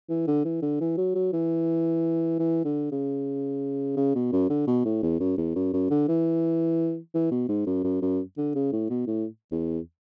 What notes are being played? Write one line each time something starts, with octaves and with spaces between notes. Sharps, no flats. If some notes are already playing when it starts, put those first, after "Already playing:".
E3
D3
E3
D3
E3
F#3
F#3
E3
E3
D3
C#3
C#3
B2
F#2
D3
B2
A2
E2
F#2
E2
F#2
F#2
D3
E3
E3
B2
G#2
F#2
F#2
F#2
D3
C#3
A2
B2
A2
E2